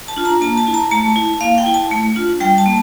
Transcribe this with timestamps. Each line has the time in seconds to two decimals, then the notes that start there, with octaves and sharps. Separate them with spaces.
0.08 A5
0.16 D4 F4
0.25 A#5
0.41 A#3 A5
0.57 A5
0.67 E4
0.74 A#5
0.91 A3 A5
1.16 E4
1.41 A#3 F5
1.58 G5
1.66 E4
1.74 A5
1.91 A3
2.16 D4 F4
2.40 G3 G5
2.58 A5
2.66 A#3